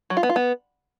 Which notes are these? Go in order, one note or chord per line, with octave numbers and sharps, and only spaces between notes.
F#3
F4
B3
F4
B3